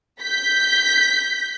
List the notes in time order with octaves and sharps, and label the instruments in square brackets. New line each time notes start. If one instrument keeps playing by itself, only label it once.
[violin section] G6 B6